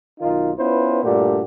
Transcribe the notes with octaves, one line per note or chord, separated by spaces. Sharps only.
B1 D#3 D#4 F4
B3 C#4 E4 F4 B4 C5
G2 A#2 A3 D4 F#4 G4